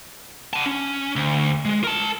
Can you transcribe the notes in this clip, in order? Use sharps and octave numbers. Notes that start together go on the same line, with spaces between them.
F#5 A5
C#4
D2
G#3
A#4 A5